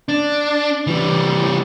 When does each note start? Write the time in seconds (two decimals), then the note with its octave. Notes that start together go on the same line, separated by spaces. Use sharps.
0.09 D4
0.87 E3 G3